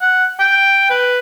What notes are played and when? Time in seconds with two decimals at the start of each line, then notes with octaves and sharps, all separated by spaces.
0.02 F#5
0.40 G5
0.90 B4